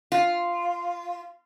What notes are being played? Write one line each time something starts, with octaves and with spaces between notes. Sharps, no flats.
F4